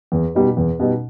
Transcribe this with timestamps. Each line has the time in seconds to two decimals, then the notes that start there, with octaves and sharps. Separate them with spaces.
0.12 E2
0.35 B2 G3 D#4
0.57 E2
0.79 B2 G3 D#4